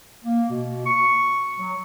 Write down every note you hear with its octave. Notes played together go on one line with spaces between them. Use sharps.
A#3
B2
C#6
F#3